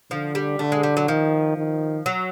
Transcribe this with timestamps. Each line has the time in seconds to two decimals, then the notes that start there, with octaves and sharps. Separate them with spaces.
0.11 D3 F3
0.35 G3
0.59 D3 A3
0.72 G#3
0.83 G3
0.97 F#3
1.08 D#3 F3
1.57 D#3
2.06 F#3